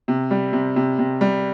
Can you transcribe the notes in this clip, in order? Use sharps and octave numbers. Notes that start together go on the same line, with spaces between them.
C3
G3
C3
C3
C3
G3